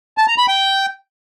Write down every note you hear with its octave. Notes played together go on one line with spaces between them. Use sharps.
A5
A#5
B5
G5